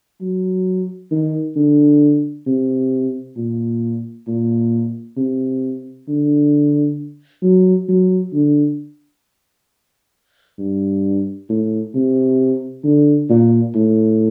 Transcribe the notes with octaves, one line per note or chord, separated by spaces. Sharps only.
F#3
D#3
D3
C3
A#2
A#2
C3
D3
F#3
F#3
D3
G2
A2
C3
D3
A#2
A2